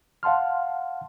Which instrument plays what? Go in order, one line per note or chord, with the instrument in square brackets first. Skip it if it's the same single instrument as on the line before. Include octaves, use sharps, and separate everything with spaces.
[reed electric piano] F5 F#5 A5 C6 F6